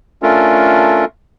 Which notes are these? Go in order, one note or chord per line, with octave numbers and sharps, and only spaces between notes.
A3 C#4 D4 F4 A4 A#4